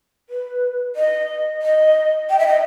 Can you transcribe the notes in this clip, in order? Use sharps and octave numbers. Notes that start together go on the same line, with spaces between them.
B4
D#5
D#5
G5
E5
D#5